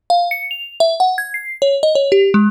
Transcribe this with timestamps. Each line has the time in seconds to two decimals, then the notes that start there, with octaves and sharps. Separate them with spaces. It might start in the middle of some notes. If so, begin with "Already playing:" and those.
0.10 F5
0.31 C#7
0.51 F7
0.80 E5
1.00 F#5
1.18 G#6
1.34 C7
1.62 C#5
1.83 D#5
1.95 C#5
2.12 G4
2.34 G#3